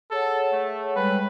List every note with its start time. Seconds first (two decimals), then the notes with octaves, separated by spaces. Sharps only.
0.11 G#4 A4 C#5 F#5
0.52 A3
0.96 G3 G#3 B4 C#5